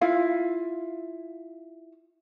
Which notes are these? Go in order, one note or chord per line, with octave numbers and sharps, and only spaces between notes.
E4 F4 F5